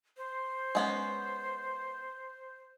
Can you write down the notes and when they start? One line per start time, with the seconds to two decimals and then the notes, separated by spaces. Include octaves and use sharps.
0.17 C5
0.75 G#3 B3 C#4